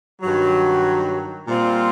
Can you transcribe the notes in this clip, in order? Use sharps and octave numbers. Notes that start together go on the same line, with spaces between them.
G2 D#3 F#3
A#2 G3 C4 F4